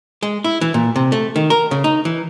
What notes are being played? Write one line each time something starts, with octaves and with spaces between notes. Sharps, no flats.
G#3
E4
E3
A#2
C3
A3
D#3
A#4
C#3
D#4
E3